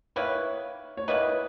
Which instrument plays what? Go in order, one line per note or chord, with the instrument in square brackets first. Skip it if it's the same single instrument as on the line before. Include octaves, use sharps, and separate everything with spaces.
[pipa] D#3 A#3 E4 B4 [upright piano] C#5
[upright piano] C#5
[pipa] D#3 A#3 E4 B4 [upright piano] D#5